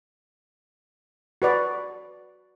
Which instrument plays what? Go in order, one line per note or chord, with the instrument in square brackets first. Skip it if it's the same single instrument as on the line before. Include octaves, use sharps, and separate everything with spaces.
[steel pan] F#4 B4 D5